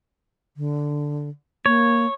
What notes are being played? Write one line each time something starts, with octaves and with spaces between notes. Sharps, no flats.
D3
A#3 C#5